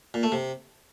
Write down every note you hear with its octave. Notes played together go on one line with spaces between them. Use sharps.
A#2
A3
C3